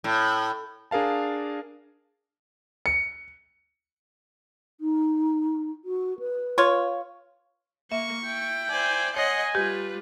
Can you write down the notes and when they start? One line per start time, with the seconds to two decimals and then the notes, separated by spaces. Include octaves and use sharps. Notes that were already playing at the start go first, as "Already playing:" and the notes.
0.04 A2
0.91 D4 G#4 A#4 F5 A5
2.86 C#7
4.81 D#4
5.85 F#4
6.19 B4
6.58 F4 C#5
7.92 A#3 E5 C#6
8.23 E4 G5
8.70 C5 D5 G#5
9.16 C#5 D#5 F#5 G#5 C6
9.55 G3 F4 G4 B4